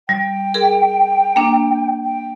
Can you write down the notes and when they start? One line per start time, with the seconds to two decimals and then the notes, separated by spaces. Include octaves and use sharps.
0.09 G3 G5
0.54 G#4 A#4
1.36 A#3 D4
2.04 G5